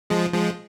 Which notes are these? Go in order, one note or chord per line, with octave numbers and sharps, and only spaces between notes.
F3 G#3
F3 G#3